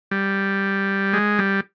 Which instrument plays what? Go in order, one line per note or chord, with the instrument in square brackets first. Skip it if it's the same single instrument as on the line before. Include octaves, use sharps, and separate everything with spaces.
[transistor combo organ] G3
G#3
G3